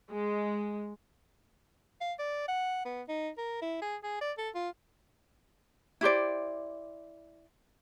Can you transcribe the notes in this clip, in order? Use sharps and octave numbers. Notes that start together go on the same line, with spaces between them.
G#3
F5
D5
F#5
B3
D#4
A#4
E4
G#4
G#4
D5
A4
F4
E4 G4 C5 D5